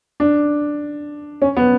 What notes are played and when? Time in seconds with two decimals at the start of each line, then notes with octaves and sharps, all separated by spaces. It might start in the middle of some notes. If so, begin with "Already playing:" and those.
0.20 D4
1.42 C#4
1.57 B3